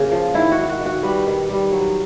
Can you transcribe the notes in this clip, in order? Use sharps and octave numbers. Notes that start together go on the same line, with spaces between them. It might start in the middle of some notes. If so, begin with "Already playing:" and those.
Already playing: C#3 A#3
F3
D#3 E4
F#4
D#3
F#4
D#3
F#4
G3 B4
D#3
G3
F#3